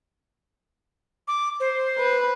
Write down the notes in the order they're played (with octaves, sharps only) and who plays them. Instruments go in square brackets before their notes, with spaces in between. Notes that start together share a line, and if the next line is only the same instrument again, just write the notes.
[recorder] D6
C5
[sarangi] B4